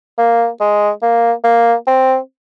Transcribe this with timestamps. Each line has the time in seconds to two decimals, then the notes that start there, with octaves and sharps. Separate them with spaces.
0.18 A#3
0.60 G#3
1.02 A#3
1.44 A#3
1.87 C4